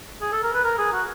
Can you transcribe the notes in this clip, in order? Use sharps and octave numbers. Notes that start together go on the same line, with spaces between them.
G#4
A4
A#4
B4
A#4
G#4
F#4